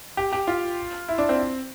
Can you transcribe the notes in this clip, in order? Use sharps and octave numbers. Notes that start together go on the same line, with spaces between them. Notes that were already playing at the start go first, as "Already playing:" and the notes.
G4
G4
F4
E4
D4
C4